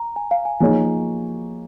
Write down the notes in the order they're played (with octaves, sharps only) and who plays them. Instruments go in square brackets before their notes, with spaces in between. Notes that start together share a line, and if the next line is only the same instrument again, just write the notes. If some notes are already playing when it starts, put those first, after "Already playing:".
Already playing: [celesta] A#5
G#5
F5
G#5
[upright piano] F3 A#3 D#4 G#4 C#5 [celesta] G#5